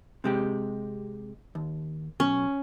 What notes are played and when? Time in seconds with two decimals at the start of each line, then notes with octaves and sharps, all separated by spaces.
0.24 C3 G#3 G4
1.55 D#2
2.20 B1 C#4